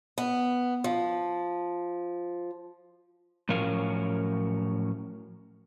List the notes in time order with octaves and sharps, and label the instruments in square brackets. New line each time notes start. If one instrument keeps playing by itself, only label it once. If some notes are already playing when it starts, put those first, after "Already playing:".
[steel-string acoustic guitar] B3
F3
[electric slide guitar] A2 F3 F#3 C#4 A#4 F5